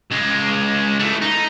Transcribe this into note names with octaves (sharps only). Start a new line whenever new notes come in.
C#2 G#3
E3 A3
D#4